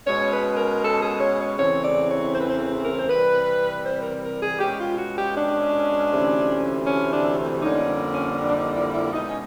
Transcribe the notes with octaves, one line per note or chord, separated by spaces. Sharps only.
B2 G#3 C#4 C#5
B4
A#4
A4
G#4
C#5
C#5
E2 C#3 E3 A3 C4 C#5
D5
C#5
C5
B4
C5
A#4
C5
C3 E3 G3 C4 B4
C5
A#4
A#4
G#4
B2 G#3 C#4 G4
F4
F#4
G4
D4
D2 C3 E3 A3 C#4
C#4
D4
F2 D3 G3 A#3 C#4 D#4
C#4
D4
D4
D#4
E4
E4
B2 G#3 B3 D#4
C#4